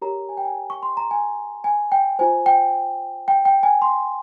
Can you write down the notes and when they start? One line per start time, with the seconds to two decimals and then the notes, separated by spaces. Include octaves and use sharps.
0.02 G4 A#4 C#5 A#5
0.29 G#5
0.37 G5
0.45 G#5
0.70 C#6
0.83 C6
0.97 A#5
1.11 G#5
1.64 G#5
1.92 G5
2.19 F4 C5 G#5
2.46 G5
3.28 G5
3.45 G5
3.63 G#5
3.82 C6